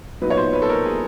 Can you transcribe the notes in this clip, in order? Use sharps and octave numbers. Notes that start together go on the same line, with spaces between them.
A#2 F#3 B3 D#4 B4
C#5
C5
B4
A4
A#4
G#4